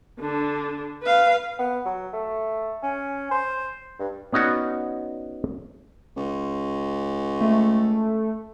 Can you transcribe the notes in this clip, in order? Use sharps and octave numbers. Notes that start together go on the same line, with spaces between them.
D3 D4
B4 F5
B3
F#3
A3
C#4
C5
G2
B3 C#4 D#4 F#4 D5 F#5
C#2
A3